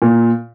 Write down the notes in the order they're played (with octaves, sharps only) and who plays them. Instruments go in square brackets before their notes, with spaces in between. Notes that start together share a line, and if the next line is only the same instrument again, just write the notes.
[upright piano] A#2